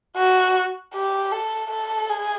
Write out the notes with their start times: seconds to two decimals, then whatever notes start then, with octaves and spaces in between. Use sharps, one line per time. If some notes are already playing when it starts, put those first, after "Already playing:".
0.17 F#4
0.93 G4
1.31 A4
1.70 A4
2.09 G#4